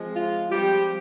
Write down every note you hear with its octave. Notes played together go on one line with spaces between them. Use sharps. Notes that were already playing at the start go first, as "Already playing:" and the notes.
Already playing: F3 G#3 C4
F4
F3 G3 G#3 C4 G4